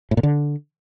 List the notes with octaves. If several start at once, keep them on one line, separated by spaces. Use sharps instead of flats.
A2
A#2
D3